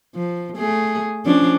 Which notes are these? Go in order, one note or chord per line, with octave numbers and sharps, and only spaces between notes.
F3
A3 G#4
F3 C#4 D4